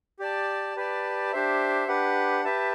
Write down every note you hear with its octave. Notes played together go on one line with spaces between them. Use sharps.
G4 D5 A5
G4 B4 D5 A5
D4 G4 C5 E5
D4 G4 B4 F#5
G4 B4 E5 A5